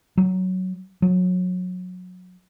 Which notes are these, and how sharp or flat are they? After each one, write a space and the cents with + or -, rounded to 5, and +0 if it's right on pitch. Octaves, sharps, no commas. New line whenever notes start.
F#3 +5
F#3 -25